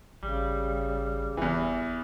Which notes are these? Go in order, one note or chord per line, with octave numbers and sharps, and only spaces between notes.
G#1 C#3 G3
F#1 E2 E3